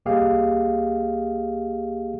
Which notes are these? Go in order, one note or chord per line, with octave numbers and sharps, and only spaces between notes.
C2 A#3 G4 G#4 D#5 F5